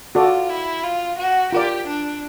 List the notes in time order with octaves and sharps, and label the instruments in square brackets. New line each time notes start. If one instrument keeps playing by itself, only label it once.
[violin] F4 [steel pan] F#4 A4 D5
[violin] E4
F4
F#4
[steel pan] F4 A#4 D5 [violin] G4
[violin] D4